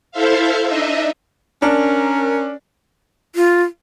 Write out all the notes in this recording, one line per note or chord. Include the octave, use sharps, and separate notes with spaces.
E4 A4 C5 E5 F5
D4 D#4 D#5 E5
C#4 D4 A#4
F4